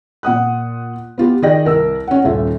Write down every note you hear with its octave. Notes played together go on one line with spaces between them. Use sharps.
A#2 F#5 D#6 F#6
B3 F4 G4
D#3 G#4 D5 D#5 G5 A#6
C2 A#4 E6
C#4 F#5
D#1 F4 E5